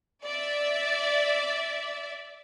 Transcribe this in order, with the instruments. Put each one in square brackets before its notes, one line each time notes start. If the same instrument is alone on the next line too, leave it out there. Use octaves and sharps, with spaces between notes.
[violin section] D5 E5